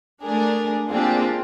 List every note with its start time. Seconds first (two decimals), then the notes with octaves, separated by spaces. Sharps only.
0.22 A3 D4 G#4 A#4
0.91 A#3 C4 D4 F4 G4 G#4